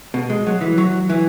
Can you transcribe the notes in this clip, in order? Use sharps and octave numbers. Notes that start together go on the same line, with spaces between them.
B2
G#3
F#3
E3
F#3
E3